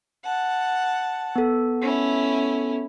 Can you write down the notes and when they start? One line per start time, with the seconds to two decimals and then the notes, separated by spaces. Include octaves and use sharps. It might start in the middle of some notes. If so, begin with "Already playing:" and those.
0.24 F#5 A5
1.36 B3 A4
1.82 C#4 E4